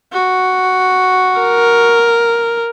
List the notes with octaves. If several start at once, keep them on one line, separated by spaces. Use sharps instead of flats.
F#4
A#4